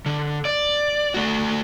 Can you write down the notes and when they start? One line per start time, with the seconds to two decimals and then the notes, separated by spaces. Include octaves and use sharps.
0.06 D3
0.45 D5
1.14 A3 F#4